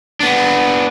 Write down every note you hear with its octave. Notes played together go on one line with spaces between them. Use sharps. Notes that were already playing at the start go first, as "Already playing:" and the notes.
B3 D4